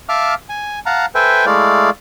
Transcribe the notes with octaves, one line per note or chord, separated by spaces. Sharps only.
E5 F5 A5 D6 F6
G#5
F5 F#5 A5 A#5
A4 B4 C5 E5 G5 G#5
G#3 A3 E4 D5 F5